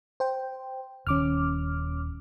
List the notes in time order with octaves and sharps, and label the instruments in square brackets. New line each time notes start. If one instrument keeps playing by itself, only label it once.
[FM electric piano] C5 G5
[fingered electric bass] D#1 D#3 [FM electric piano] C#4 D6 F6